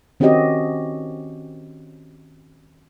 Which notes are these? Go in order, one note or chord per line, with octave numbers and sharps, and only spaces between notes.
D#3 C4 C#4 F#4 G4 D#5